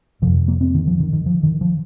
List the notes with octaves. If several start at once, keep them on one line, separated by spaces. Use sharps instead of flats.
F2 C3 F3
A#3
C4
D#3
F3
D#3
D#3
F3
D#3
F3